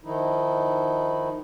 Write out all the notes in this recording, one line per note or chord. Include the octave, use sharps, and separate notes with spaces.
D#3 F3 D#4 E4